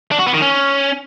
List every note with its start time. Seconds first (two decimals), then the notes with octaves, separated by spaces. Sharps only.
0.12 D4
0.19 F#4
0.27 B3
0.34 D#3
0.42 C#4